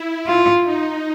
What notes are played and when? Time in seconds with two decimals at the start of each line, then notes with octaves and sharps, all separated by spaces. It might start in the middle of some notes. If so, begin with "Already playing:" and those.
Already playing: E4
0.27 F4
0.64 D#4